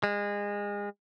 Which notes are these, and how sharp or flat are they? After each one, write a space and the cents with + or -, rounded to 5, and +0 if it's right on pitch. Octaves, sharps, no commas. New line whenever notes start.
G#3 -30